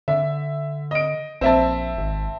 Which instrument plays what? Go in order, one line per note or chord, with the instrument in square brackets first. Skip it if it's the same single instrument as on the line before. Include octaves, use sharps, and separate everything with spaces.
[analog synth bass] D3 [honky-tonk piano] E5
[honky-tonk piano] D#5 D7
[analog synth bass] A#1 [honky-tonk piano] C4 E5 A5
[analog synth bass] G#1